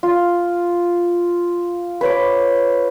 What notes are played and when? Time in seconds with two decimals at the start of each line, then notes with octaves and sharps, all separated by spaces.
0.03 F4
2.01 B4 C#5 D6